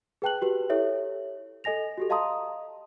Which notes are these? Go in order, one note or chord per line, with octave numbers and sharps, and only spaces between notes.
G#4 B4 G5 A5 F#6 F#7
F#4 G4 B4
E4 G4 A4 C#5 E5
A4 D#5 G#5 A#6 F7
F#4 G4 A4
D#5 F5 A5 A#5 C6 D#6